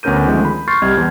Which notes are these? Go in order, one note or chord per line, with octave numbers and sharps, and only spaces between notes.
D2 B3 C#4 A#4 G6 D#7
D3 D#3 F3 G#3 A3 C4
B5
C6 C#6 F6 G6 A6 C7
C2 C3 G3 D#5 F6 G#6
E2 B3